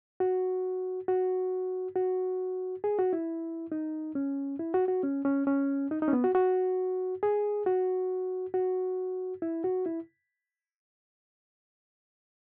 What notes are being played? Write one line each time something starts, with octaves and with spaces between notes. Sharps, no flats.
F#4
F#4
F#4
G#4
F#4
E4
D#4
C#4
E4
F#4
F#4
C#4
C#4
C#4
D#4
D#4
C#4
B3
F#4
F#4
G#4
F#4
F#4
E4
F#4
E4